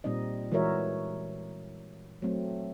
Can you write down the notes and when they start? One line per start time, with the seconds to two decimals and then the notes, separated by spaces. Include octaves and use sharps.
0.04 A#2 G3 C4 D#4 D#5
0.52 E3 G#3 F#4 A#4 C#5 E5
2.22 F#3 A3 C4